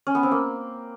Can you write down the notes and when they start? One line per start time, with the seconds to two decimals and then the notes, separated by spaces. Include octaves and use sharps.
0.07 C#4
0.15 B3
0.23 C4
0.31 A#3